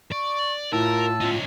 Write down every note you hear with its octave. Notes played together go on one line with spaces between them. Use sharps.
D5 C#6
A2 F4 A#4 A5 E6
C#4 D#4 F4